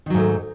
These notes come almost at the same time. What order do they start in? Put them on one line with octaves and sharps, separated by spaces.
D#3 F#3 G#2 A3